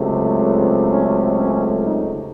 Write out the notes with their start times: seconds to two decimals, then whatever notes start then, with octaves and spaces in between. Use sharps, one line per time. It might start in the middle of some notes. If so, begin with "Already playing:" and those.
Already playing: C#2 C3 F#3 A3
0.90 C#4
1.37 C#4
1.83 D#4